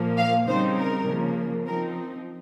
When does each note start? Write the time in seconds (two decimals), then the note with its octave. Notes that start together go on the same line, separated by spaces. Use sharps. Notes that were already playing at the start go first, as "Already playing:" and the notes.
Already playing: A#2 F3 A#3
0.18 F5
0.48 C#3 G3 C4 D#4 C5
0.78 A#4
1.07 C#3 F3 A#3
1.67 F3 C4 D#4 A#4